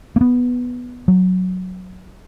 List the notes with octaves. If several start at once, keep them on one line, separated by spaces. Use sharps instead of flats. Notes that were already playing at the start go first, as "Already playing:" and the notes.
A#3
B3
F#3